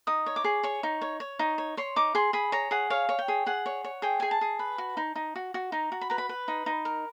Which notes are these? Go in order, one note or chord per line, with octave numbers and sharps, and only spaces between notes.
D#4 D#6
C#5
D6
G#4
C#5 C#6
D#4
C#5
C#5
D#4
C#5
C#5 C6
D#4 D6
G#4 C6
G#4 B5
C#5 A#5
G#4 F#5
C#5 F5
C#5
G5
G#4
G#4 F#5
C#5
C#5
G#4 G5
G#4 G#5
A5
G#4
B4
F#4
D#4
D#4
F#4
F#4
D#4 A#5
F#4
B5
B4 A#5
B5
B4
D#4
D#4
A#4